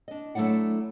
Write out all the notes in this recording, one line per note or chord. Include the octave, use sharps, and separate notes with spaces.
D4 D#5
F#3 A3 C4 D4 E4 F#5